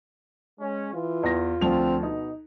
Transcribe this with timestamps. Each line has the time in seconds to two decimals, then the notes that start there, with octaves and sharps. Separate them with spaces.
0.60 G#3 C#4
0.94 E3 F4
1.23 E2 A#6
1.61 D2 F3 C4 F7
2.03 B2 D#4